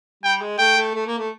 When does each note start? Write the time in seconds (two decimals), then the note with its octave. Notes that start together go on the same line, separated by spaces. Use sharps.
0.23 G3 G5
0.41 G#3
0.59 A3 G5
0.77 A3
0.94 A3
1.07 A#3
1.18 A3